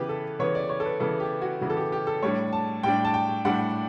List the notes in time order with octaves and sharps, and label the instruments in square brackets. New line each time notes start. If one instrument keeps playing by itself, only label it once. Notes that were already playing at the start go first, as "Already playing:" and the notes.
Already playing: [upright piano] C#3 E3 B3 G4 B4
A4
C#3 E3 B3 C#5
D5
C#5
A4
B4
C#3 E3 B3 A4
G4
F#4
C#3 E3 B3 F#4
A4
G4
G4
A4
A2 G3 D4 C#5
A5
A2 G3 D4 G5
A5
G5
A2 G3 D4 F#5